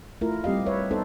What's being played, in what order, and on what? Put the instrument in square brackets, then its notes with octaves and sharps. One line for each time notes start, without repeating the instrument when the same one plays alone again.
[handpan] A3 E4 F4 A#4
G3 C4 G4 D#5 F5
B4 C#5 E5
B3 D#4 A4 C5